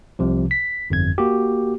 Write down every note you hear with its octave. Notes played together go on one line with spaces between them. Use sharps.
C2 C3 F3
B6
G1 F2 G#6
A#3 F#4 G4